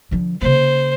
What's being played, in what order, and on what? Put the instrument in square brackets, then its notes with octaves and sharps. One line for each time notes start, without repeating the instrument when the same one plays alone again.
[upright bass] D3 F3
[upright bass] C#3 A#3 [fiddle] C5